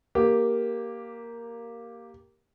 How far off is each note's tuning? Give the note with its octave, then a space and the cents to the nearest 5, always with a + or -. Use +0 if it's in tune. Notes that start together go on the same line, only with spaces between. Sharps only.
A#3 +0 G4 +0